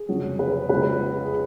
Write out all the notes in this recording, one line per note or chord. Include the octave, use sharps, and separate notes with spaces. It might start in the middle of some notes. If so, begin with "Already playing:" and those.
Already playing: G#4
F1 F2 C#3 F#3
B4
C#2 C#3 F#3 B4
G#4